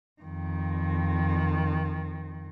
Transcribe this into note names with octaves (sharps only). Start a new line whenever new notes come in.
F2 D#3